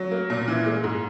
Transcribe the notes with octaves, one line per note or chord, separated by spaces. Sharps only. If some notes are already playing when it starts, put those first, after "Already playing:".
Already playing: F#3
A#3
A#2
E3
G#3
G#2